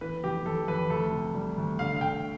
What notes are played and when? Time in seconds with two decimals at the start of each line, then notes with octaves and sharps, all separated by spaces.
0.01 E3 B4
0.23 F1 G4
0.46 F2 A4
0.68 F2 B4
0.90 D2 A4
1.12 C3
1.35 G3
1.57 D2
1.79 D3 F5
1.96 F5
2.01 D3 G5